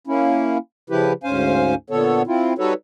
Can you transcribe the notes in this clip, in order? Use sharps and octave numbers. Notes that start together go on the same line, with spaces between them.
A#3 C#4 E4
C#3 F3 E4 G4 B4
D2 G#2 C#4 C5 F5 G#5
A#2 D3 B3 A4 C#5
C4 E4 F4
G3 D#4 F#4 A4 B4 C#5